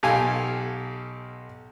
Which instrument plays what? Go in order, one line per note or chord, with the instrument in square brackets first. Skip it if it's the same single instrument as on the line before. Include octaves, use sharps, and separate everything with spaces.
[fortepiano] B1 G4 A4 F5 G#5